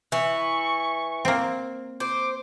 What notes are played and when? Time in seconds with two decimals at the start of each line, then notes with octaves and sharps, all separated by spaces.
0.12 E3 C#6
1.25 A#3 C4
2.00 C5 D6